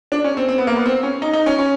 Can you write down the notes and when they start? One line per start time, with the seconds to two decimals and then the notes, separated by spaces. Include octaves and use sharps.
0.12 D4
0.24 C#4
0.37 C4
0.49 C4
0.58 B3
0.67 A#3
0.76 B3
0.86 C4
1.03 C#4
1.22 D#4
1.33 D#4
1.46 C#4
1.59 C#4